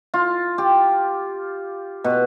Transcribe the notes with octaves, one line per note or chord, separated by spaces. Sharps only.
F4
G4
B2